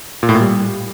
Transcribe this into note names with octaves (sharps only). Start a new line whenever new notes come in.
A#2
A2
A#2
G3